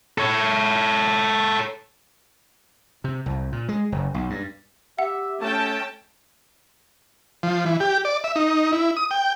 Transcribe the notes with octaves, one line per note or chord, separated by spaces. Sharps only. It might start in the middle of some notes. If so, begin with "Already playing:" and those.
A4 C#5
C3
C2
A#2
G#3
F#1
B1
G2
G4 E5 F#5
A3 C#4 G5 A5
F3
E3
G4
D5
E5
D#4
E4
D#6
G5